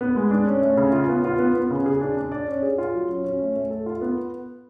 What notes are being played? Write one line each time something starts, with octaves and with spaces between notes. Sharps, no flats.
B3
G#3
D4
C#4
A3
C#3
F4
B3
F4
B3
B3
C#3
G#4
D4
D4
D5
C#4
G#4
F4
F#3
C#4
C#4
A3
A3
A4
F4
B3